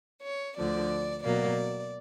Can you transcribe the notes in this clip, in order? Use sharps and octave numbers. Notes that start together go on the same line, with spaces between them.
C#5
D2 D3 F3 D5
B2 F#3 A#3 D5